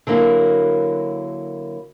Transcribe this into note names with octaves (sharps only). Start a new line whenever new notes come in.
D3 F#3 A#3 E4 F#4